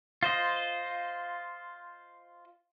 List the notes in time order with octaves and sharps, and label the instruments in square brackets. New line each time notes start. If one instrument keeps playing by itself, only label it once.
[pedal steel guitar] F4 C5 D#5